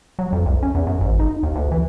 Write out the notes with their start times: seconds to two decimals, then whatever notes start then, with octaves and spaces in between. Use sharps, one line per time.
0.19 F#3
0.32 F2
0.46 C2
0.63 C#4
0.75 E2
0.87 F#2
1.01 G#1
1.19 D#4
1.43 D#2
1.56 D2
1.72 E3